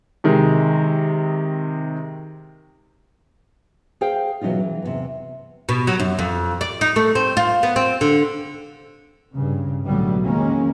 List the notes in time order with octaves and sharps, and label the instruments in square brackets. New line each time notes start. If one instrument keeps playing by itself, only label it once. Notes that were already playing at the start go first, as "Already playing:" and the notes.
[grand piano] C3 D#3 G#3
[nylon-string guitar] G#4 C5 F5 G5
B2 E3 F#3 C#4 D#4 F4
E3
E2 A2 C3
[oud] B2
F#3
F#2
F2
D5
D#4
A3
C4
F4
B3
C4
D3
[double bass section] G2 C#3
B1 A2 D3 F#3 G3 B3
F2 D#3 G#3 A#3 C#4